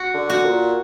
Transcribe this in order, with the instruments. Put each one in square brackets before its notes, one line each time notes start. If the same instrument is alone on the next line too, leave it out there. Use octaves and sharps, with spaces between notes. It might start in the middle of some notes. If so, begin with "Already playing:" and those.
Already playing: [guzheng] F#4
[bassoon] D3
[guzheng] F#4
[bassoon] A#2